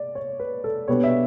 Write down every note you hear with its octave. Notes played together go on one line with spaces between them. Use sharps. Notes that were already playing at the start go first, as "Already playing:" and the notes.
Already playing: D5
C#5
B4
A4
B2 G3 B3 D4 C#5
E5